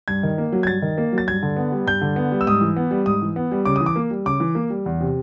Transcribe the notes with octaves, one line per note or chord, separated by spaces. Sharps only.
G2 G#6
D#3
A#3
F#3
G#6
G2 A6
D#3
A#3
F#3
A6
G2 G#6
D3
B3
G3
G2 G6
D3
B3
G3
E6
G#2 D#6
E3
B3
G3
G#2 D#6
E3
B3
G3
C#3 D6
E3 D#6
D6
A#3
G3
C#3 D6
E3
A#3
G3
E2
C3